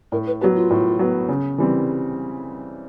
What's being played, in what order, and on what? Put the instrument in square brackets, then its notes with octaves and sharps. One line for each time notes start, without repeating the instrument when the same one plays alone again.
[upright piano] A2 [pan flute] A#4
[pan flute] B4
[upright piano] F#3 B3 [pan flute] G4
[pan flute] F4
[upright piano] A2
F#3 B3
C#3
E3 G3 C4